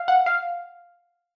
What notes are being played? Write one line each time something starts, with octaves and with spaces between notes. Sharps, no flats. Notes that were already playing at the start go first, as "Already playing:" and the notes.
Already playing: F5
F#5
F5